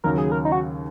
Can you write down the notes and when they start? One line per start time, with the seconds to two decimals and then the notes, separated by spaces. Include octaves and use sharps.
0.04 D#2 C#3 F#3 A#4
0.18 G#4
0.32 A#4
0.45 D#4
0.52 F#4